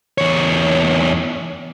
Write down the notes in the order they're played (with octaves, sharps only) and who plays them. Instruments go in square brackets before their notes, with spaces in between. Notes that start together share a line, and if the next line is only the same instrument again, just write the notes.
[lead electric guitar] E2 C#5